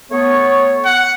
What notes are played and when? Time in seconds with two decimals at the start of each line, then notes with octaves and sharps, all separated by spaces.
0.12 A3 B3 C#5
0.85 F#5